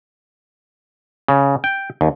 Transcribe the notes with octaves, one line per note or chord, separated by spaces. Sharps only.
C#3
G5
D#2